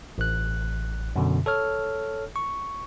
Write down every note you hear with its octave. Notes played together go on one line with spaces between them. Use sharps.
A1 F#6
F#2 B2 D3
A4 C#5 F6
C#6